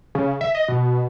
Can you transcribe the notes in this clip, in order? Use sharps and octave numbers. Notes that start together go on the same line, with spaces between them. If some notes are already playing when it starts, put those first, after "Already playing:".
C#3
E5
D#5
B2